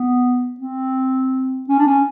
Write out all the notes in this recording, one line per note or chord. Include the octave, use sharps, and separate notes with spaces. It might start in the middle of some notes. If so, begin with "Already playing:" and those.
Already playing: B3
C4
C#4
D4
C#4